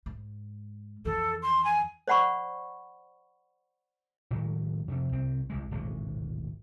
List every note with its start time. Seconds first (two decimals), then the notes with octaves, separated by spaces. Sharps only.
0.06 G#2
1.05 F2 E3 A4
1.43 C6
1.65 G#5
2.08 C5 D5 F#5 B5 C#6
4.31 A2 D#3 F#3 G#3
4.88 F2 C3
5.12 C2 C3 C4
5.50 C2 C3 G#3
5.71 D1 G#1 B2 G#3